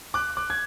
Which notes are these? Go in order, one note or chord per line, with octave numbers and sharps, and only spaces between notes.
D6 F#6
D6 F#6
G#6